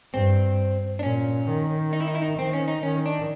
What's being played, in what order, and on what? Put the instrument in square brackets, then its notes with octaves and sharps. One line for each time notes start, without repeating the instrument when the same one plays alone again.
[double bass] G2 [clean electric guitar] C4
[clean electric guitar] D4
[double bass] A#2 [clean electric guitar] C#4
[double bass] D#3
[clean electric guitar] D#4
E4
D#4
E4
D#4
[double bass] D#3 [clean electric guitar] C4
[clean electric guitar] C#4
D#4
[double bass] D#3 [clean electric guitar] C#4
[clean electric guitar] D4